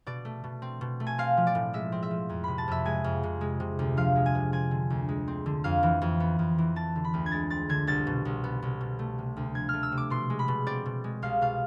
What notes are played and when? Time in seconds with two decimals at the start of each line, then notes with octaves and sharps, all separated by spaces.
0.06 B2 D5
0.25 A3
0.44 B2
0.62 C4
0.81 B2
1.00 A3
1.07 G#5
1.18 C4 F5
1.37 F3
1.47 D5
1.55 A2
1.73 G#3 E5
1.92 C4
2.03 E5
2.11 F3
2.29 F2
2.44 C3 B5
2.58 A5
2.68 F2 E5
2.85 G#3 G#5
3.04 F2
3.23 C3
3.41 G#3
3.60 C3
3.79 D2
3.97 F3 F5
4.16 G#3
4.26 G#5
4.35 C3
4.52 C4 G#5
4.71 D3
4.90 D2
5.09 G#3
5.28 C4
5.46 D3
5.64 F2 F5
5.83 E3
6.02 F2
6.20 B3
6.39 F2
6.58 E3
6.76 C4 A5
6.96 D3
7.04 B5
7.14 D2
7.26 G#6
7.32 G#3 A6
7.50 C4 A6
7.69 D3 G#6
7.87 C2 A6
8.07 B2
8.25 C2
8.44 B3
8.63 C2
8.81 B2
8.99 A3
9.18 C3
9.37 D2
9.55 F3 G#6
9.69 A3 F6
9.83 E6
9.92 C3
9.97 D6
10.10 B2 C6
10.30 G#3
10.39 B5
10.48 B2
10.67 C4 D5
10.86 B2
11.04 G#3
11.22 C2 F5
11.41 B2 F5